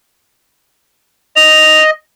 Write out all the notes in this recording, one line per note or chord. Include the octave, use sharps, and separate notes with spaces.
D#5 F7